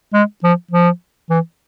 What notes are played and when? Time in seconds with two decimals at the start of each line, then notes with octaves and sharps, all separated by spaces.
0.14 G#3
0.44 F3
0.71 F3
1.30 E3